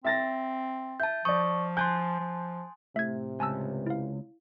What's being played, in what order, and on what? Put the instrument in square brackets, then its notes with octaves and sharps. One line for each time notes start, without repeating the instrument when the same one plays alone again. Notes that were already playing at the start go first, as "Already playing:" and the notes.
[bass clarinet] C4 [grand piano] E5 A6 A#6
[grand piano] E5 [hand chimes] A5 G6
[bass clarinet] F3 [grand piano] D5 D#6 [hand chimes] C#6
[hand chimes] G#5 A5 C6 [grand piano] F#6 G6
[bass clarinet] F3
[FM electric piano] A2 [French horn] C3 [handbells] E5 G#6
[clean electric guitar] C#2 [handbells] G#5 A5 E6
[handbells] E4 F5